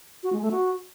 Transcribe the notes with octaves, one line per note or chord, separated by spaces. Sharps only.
F#4
G#3
A3
F#4